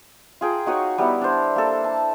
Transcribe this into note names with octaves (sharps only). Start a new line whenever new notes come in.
F4 G#4 G5 A#5
D#4 F#4 C#5 D#5
G3 B3 E4
D4 C5
A#3 A4
A5